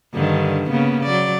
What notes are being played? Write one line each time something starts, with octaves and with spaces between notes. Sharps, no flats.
G2 D3 D#3
C#3 A#3 B3
F#3 D5